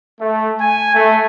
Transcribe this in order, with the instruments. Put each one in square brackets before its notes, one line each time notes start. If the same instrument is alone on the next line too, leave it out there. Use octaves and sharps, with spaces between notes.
[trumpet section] A3
G#5
A3